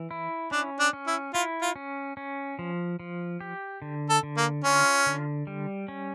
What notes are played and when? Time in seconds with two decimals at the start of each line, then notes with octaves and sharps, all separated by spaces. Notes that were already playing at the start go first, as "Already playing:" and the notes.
Already playing: E3
0.11 E4
0.51 C#4 D4
0.79 D4
0.93 C#4
1.07 E4
1.34 E4 F4
1.62 F4
1.76 C#4
2.17 C#4
2.59 F3
2.99 F3
3.41 G4
3.82 D3
4.10 A4
4.23 D3
4.37 A#3
4.64 C#4 F4
5.06 D3
5.47 G3
5.88 C#4